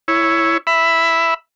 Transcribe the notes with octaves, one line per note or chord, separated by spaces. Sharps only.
E4 C#5
E5 B5